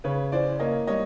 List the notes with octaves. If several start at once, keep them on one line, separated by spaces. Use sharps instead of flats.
C#3 B4 C#5
E3 C5 D5
A#3 C#5 D#5
G3 C#5 D#5